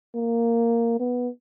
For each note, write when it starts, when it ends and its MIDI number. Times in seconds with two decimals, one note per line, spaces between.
0.15 0.96 58
1.00 1.28 59